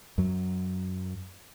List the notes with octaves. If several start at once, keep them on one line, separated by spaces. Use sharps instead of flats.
F#2 F#3